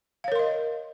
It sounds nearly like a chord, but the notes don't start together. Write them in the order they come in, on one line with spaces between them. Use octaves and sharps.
F5 C#5 A#4 C6 D#5